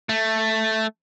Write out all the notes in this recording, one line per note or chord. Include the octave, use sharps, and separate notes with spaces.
A3